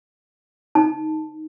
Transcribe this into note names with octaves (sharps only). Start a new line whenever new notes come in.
D#4 A5